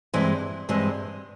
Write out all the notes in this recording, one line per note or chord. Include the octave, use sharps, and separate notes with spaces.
G2 E3 G#3 C4
G2 E3 G#3 C4